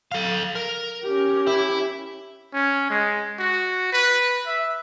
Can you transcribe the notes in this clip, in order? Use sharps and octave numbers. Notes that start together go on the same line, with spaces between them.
A4 F5
A#4
C#4 G4
E4
C#4
G#3
F#4
B4
E5